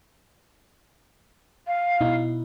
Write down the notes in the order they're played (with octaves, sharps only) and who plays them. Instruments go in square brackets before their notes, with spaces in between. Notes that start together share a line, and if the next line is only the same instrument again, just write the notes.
[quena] F5
[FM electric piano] B2 D#4 E4